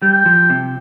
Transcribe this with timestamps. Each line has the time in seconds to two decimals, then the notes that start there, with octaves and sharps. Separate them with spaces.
0.02 G3 G5
0.26 F3
0.50 C3